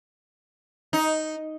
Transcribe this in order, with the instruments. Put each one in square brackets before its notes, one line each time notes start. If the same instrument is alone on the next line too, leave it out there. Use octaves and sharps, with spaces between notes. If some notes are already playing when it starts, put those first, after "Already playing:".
[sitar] D#4